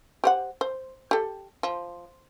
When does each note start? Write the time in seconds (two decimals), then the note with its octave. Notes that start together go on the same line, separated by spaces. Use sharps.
0.24 G4 C5 F#5
0.61 C5
1.11 G4 A4
1.63 F3